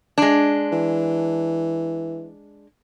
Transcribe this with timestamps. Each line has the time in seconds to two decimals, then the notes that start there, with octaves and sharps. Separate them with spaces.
0.18 G#3 D4
0.72 E3